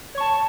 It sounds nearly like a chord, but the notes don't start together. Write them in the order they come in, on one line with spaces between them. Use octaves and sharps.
C#5 C#6 A5